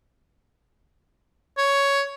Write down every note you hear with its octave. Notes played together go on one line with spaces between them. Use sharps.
C#5